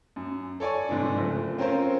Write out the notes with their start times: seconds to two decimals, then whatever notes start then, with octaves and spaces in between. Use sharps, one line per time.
0.16 F#2
0.60 A4 C#5 D5 G#5 C#6
0.89 G1 G#2 C3 E3 D4
1.17 F#1 F3 A3
1.58 C4 C#4 F4 A#4 C5